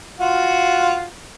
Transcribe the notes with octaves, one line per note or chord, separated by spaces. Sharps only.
F4 F#4